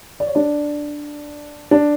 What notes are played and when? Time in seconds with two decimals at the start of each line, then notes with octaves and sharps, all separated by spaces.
0.20 D5
0.27 C#5
0.35 D4 D5
1.71 D4 D5